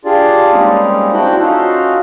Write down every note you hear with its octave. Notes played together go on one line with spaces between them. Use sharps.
D4 F4 G4 G#4 D5
G3 G#3 A#3 C4 C#4 D#4
D4 E4 F#4 C5 G5
C#4 D#4 F4 F#4 A4